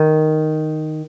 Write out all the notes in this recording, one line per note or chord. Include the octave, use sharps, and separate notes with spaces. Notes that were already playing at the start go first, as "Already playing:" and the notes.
Already playing: D#3